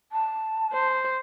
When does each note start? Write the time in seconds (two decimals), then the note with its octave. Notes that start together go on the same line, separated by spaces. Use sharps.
0.12 A5
0.73 C5